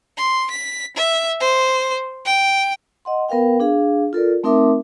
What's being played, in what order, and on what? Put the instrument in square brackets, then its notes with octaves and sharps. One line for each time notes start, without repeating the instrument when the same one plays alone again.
[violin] C6
B6
E5
C5
G5
[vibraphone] D#5 F#5 C6
B3 A#4 B4 F5 G5
D4 G#4 F5
F4 A4 A#4 D5
A3 C4 D#4 A#4 E5 D6